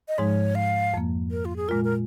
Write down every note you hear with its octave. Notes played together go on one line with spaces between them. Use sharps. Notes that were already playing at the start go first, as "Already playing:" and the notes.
D#5
G#2 F3 G#3 D#4 C#5
F5
F2 F3 A#3
A#4
F4
G#4
A#2 G#3 F4 A#4
A#4